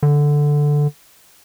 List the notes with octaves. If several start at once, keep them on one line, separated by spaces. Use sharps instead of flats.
D3